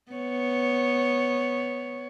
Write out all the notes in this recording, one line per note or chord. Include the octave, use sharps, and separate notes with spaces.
B3 C#5